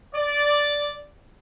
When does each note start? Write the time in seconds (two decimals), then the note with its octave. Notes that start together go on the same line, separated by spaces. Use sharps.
0.15 D5